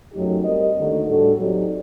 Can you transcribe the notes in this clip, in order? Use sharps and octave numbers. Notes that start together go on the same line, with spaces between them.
F#2 F#3 A3 D#4 G4
G3 C4 G4 A#4 D#5
D#2 D3 A3 D#4 F#4
A2 G3 D4 F#4 A4
F#3 C4 D#4 G4 D5